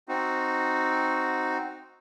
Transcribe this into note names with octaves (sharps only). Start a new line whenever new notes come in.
C4 D#4 F#4